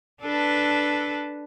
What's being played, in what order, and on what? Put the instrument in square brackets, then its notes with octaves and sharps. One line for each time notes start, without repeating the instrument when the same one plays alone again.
[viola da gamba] D4 A4 B4